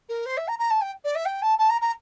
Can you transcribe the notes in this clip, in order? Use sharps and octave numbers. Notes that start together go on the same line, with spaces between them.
A#4
C5
E5
A#5
A#5
A5
G5
D5
E5
G5
A5
A5
A#5
A#5